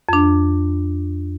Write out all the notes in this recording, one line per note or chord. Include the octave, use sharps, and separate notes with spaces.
F2 D4